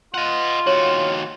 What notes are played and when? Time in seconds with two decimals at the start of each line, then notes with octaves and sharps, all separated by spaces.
0.14 F4 D#5 F#5
0.67 D#2 F#4 C#5